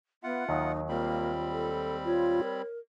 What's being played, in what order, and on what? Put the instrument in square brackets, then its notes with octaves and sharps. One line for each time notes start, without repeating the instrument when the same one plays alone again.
[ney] B3 [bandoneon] F4 F#5 [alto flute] E5
[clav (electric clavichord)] D#2 D#3 F#3 [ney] D#4
[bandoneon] G3 C4 B5 [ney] A#3 [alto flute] F4
[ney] A4
[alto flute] F4 [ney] C#5
[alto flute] A#4